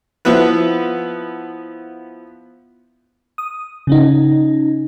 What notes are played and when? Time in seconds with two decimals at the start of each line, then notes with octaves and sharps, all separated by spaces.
0.25 F3 B3 E4 B4
3.38 D#6
3.87 C#3 C#4 D#4